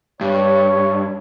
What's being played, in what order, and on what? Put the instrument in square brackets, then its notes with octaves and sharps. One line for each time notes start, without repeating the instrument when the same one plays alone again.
[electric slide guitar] G2 [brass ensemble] C#5